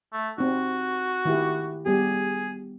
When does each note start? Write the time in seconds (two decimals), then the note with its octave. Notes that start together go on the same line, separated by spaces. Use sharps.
0.13 A3
0.38 C4 D#4 F#4
1.25 D#3 E4 G4
1.86 G3 B3 G4 G#4